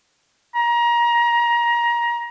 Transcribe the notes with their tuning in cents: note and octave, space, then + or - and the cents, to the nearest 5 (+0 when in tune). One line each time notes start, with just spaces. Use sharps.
A#5 +25